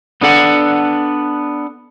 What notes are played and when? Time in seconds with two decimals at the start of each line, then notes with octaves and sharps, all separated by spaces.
0.21 B3 D4 A4 F#5